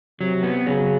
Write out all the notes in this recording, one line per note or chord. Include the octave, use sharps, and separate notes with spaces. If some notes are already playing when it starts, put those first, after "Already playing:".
C3 F#3
B3
C#3 F#3